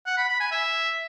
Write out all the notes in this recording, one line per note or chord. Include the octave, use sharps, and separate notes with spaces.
F#5
B5
B5
G#5
E5